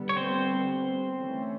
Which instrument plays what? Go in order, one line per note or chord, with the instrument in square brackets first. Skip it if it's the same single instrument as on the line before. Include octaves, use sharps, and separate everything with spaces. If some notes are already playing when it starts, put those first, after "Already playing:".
Already playing: [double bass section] D3 G3 B3
[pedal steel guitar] C#5
C4 C5
[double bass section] E3 A3 C#4